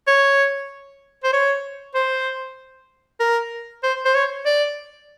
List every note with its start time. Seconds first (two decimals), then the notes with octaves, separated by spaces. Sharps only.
0.08 C#5
1.24 C5
1.34 C#5
1.95 C5
3.20 A#4
3.83 C5
4.05 C5
4.15 C#5
4.46 D5